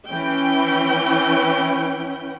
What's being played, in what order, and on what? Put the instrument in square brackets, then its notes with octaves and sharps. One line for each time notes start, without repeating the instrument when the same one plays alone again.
[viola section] E3 C#4 G5